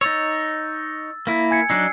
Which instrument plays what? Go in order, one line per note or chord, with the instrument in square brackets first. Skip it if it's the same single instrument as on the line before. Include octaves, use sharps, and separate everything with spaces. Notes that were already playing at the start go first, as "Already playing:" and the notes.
[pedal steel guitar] D#4 C#5 [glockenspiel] E6 A6
[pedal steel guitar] A#3 E4
[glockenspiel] G#5 G#6 C#7
[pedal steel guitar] F#3 D4 D#4 [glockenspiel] E6 C7